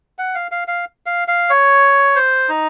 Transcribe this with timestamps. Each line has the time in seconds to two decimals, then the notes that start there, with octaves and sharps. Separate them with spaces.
0.18 F#5
0.35 F5
0.51 F5
0.68 F5
1.06 F5
1.28 F5
1.50 C#5
2.16 C5
2.49 D#4